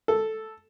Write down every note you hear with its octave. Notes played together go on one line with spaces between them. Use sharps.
A4